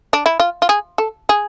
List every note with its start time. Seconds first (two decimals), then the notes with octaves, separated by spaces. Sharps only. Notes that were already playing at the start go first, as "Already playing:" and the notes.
0.13 D4
0.26 E4
0.40 F4
0.62 F4
0.69 G#4
0.98 A4
1.29 G#4